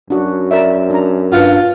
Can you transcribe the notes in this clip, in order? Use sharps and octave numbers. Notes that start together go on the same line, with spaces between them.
F#2 D4 F#4
A#4 D5 E5
D4 A#5
G2 F4 F#5